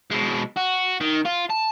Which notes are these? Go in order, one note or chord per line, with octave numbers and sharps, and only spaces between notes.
B2 G#3
F#4
D#3
F4
A5